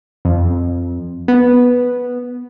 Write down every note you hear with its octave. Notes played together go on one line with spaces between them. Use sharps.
F2
B3